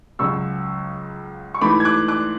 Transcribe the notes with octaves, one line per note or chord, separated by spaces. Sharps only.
C#2 C#3 F#3 C#6 E6
C#6
G#2 E3 A3 B5 D6
G#6
D6 F#6
D6 F#6